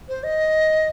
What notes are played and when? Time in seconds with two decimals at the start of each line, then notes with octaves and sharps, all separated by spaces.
0.09 C5
0.24 D#5